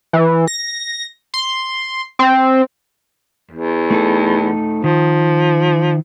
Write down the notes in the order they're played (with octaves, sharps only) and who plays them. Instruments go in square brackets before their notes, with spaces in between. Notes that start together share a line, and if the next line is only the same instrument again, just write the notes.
[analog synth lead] E3
A#6
C6
C4
[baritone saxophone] E2
[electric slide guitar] A3 D#4 A4
[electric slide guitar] D#3 [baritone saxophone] F3